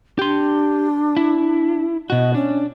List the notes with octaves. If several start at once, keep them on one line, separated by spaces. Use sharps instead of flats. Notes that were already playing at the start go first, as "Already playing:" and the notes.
D4 G4 C6
E4
B2 F#4 D#5
C#4 D4